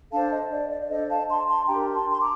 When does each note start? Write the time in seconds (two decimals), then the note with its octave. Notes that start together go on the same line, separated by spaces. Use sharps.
0.11 D4 A4 C5 F5 A5
0.30 D#5
0.50 D5
0.70 D5
0.81 D5
0.89 D4 A4 C5 D#5
1.09 F5 A5
1.29 A5 C6
1.48 A5 C6
1.68 D4 G4 A#4 G5 A#5
1.93 A5 C6
2.10 C6
2.20 A#5 D6